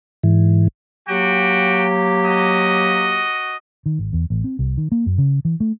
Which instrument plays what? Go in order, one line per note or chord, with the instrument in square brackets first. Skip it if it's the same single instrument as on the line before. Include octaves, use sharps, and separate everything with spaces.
[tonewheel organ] G#2 E3
[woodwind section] F#3 A#3 G4 [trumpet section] F#4 G5
[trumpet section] F#4 D#5
[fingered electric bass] D#3
G#1
E2
A1
C4
C2
D#3
A#3
F#2
C#3
E3
A3